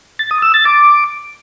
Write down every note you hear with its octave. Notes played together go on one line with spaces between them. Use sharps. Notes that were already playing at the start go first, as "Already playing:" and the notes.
A6
D#6
E6
A6
D6